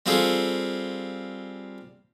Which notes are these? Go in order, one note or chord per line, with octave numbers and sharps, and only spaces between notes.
G3 C4 F4 G#4 A4